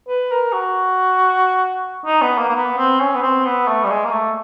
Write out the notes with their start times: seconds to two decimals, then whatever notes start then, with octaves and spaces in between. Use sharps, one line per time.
0.08 B4
0.32 A#4
0.53 F#4
2.05 D#4
2.22 B3
2.38 A#3
2.49 A#3
2.55 B3
2.78 C4
3.00 C#4
3.15 B3
3.22 C4
3.45 B3
3.68 A3
3.84 G3
3.90 G#3
4.04 A#3
4.12 A3